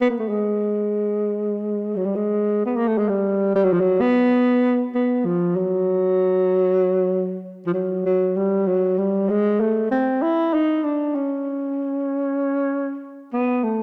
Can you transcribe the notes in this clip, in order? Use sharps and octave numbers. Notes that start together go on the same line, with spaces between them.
B3
A#3
A3
G#3
F#3
G3
G#3
B3
A#3
A3
G#3
G3
G3
F#3
F3
F#3
B3
B3
F3
F#3
F3
F#3
F#3
G3
F#3
G3
G#3
A3
C4
E4
D#4
D4
C#4
B3
A3